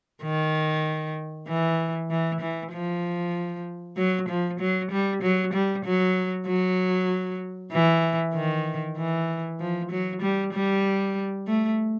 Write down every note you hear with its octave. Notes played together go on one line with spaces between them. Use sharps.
D#3
E3
E3
E3
F3
F#3
F3
F#3
G3
F#3
G3
F#3
F#3
E3
D#3
E3
F3
F#3
G3
G3
A3